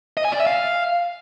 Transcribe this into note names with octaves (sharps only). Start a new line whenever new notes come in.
D#5
G#5
D5
E5
F5